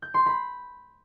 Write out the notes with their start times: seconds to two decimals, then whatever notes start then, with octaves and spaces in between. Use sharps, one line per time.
0.02 G6
0.14 C6
0.26 B5